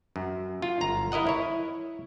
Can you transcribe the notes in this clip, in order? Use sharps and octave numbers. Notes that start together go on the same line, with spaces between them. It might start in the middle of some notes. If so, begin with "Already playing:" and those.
F#2
F4
G1 A#5
E4 A#4 D#5 F#5
E4 C#5